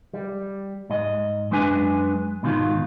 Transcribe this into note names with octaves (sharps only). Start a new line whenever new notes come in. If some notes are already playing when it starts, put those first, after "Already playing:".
G3
G#2 D#5
F#2 G#3 D4 B4 G#5
G#2 B2 D#3 F4